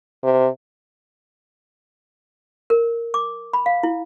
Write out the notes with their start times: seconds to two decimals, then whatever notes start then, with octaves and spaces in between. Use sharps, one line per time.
0.23 C3
2.70 A#4
3.14 D6
3.53 B5
3.66 F5
3.83 E4